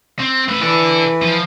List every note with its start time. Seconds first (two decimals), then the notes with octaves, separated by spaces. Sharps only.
0.19 C4
0.48 A3 B4
0.62 E3 A4 D5
1.22 F3